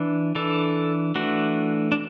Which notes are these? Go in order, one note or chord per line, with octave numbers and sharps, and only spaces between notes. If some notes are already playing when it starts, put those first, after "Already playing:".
Already playing: E3 D4
E3 D4 A4
E3 A3 D4 F#4
D4